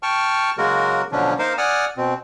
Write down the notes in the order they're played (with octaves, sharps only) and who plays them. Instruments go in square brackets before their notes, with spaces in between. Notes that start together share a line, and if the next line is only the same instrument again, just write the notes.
[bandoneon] G5 A5 C#6 F6
C#3 F#3 G#3 A#3 F#4 A#4
B2 D3 F3 F#3 C#4 D4
A#3 D#4 A#4 C5 F5
D5 F#5 G#5 D#6 F6
B2 C4